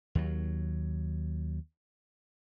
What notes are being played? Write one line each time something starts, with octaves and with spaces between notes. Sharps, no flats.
D#2 F#3